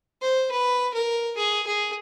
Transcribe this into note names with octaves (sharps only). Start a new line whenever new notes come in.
C5
B4
A#4
G#4
G#4